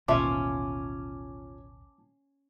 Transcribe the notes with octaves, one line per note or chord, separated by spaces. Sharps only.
A1 D#2 B2 C#4 F4 E5 A5 D6